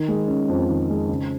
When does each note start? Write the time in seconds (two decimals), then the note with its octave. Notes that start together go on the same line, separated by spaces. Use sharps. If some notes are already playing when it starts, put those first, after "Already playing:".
Already playing: D#3
0.08 G#3
0.28 C#4
0.49 F2
0.69 D#3
0.90 G#3
1.09 C#3